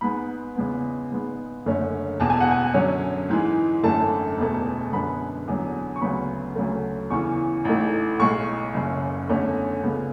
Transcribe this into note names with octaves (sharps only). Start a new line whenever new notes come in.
G#2 G#3 B3 B5
E2 C#3 G#3 B3
G#2 G#3 B3
F#1 F#2 D3 A3 C#4
E1 E2 B2 A5
G#5
F#5
G#5
F#2 D3 F#3 C#4
G#2 E3 G#3
G#1 F#2 D3 A3 A5
E1 E2 B2 A3
F#2 D3 G#3 B3 B5
E2 D3 F#3
C#6
D2 C#3 F#3 B3 B5
D2 C#3 F#3 A3
E2 C#3 E3 C#6
A1 G#2 E3 A3
B1 A2 G#3 C#6
F#1 F#2 C#3
E2 D3 A3 C#4
C#2 C#3 G#3 B3